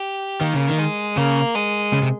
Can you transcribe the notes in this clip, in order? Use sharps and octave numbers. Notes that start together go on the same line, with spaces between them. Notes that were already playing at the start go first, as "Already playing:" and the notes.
Already playing: G4
D#3 A#3
C#3
D#3
G#3
C#3 A#3
G#3
C#3
C3